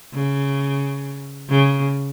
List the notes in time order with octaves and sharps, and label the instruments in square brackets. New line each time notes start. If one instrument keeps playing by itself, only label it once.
[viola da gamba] C#3
C#3